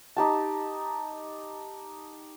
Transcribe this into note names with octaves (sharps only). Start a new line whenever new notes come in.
D#4 G4 A5